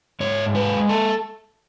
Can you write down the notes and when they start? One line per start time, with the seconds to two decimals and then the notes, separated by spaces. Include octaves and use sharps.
0.20 G#2 C#5
0.55 G#3 B4
0.89 A4